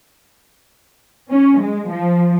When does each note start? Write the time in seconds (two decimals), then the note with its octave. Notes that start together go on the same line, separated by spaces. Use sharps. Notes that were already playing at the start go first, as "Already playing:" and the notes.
1.30 C#4
1.61 G#3
1.90 F3